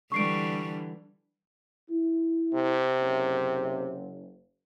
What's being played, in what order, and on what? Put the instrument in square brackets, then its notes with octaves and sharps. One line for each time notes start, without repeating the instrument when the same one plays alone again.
[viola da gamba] D3 E3 G3 [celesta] C#6 C7 D7
[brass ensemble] E4
[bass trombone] C3
[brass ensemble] F#1